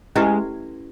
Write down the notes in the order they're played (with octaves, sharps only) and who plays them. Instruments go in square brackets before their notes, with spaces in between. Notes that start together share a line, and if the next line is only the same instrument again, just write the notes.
[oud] G#3 [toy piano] C#4 E4 G4 B4